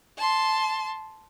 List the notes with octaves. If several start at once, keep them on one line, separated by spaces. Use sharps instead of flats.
A5 C6